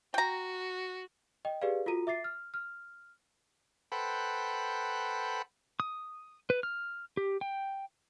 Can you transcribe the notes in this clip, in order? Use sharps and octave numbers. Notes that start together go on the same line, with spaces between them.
F#4 G5 A#5
D#5 G5
G4 G#4 B4 D5 F5
F4 F#4 A4 A#5 D#7
E5 D6 A6 C7
F6
F6
A4 B4 C5 F#5 G5 B5
D#6
B4
F6
G4
G5